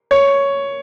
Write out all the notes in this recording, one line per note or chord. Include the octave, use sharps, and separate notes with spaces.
C#5